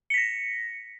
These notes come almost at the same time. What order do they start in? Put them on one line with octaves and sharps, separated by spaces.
C#7 B6 A#6